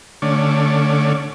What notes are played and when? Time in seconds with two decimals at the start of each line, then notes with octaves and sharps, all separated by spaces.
0.22 D3 A3 C#4 D5